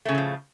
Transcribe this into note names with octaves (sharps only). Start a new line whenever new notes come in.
A2 C#3 F3 F#3 A3